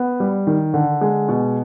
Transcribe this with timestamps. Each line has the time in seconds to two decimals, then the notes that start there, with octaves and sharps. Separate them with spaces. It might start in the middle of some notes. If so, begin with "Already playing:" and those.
Already playing: B3
0.20 G3
0.47 D#3
0.74 D3
1.01 G#3
1.29 B2